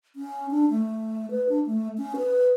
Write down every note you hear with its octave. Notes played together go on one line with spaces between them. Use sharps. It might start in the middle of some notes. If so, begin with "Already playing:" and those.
C#4
D4
A3
B4
D4
A3
C#4
B4